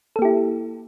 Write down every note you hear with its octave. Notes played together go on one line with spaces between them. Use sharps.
A#3 E4 G4 A4